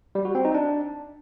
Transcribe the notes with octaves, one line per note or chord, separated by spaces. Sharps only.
G3
F#4
C4
D#4
D4